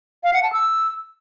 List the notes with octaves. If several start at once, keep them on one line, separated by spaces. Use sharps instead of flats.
F5
F#5
A5
E6